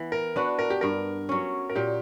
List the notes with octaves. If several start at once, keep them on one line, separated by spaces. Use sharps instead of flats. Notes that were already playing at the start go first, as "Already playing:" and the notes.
Already playing: E3 B3
A#4
B3 D4 F#4 B4
A#4
G4
G2 A#4
F#3 C#4
A#4
A#2 G4